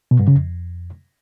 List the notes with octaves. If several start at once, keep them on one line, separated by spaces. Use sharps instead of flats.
B2
G2
C#3
F2